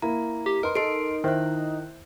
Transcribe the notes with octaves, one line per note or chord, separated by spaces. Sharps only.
A#3 E4 A#5
G4
D#4 A#4 B4 C6
A4 D#5 C6 C7 D7
D#3 E4 C5 E5 F#6